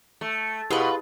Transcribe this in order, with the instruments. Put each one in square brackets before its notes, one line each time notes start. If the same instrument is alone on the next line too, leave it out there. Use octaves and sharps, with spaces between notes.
[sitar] A3
[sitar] B2 [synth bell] E4 G4 G#4 [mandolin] F4 B4